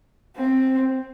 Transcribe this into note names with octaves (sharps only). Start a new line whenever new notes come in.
C4